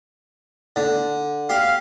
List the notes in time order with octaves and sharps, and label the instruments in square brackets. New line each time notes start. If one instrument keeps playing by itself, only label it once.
[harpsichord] D3
[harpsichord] G4 [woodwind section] F5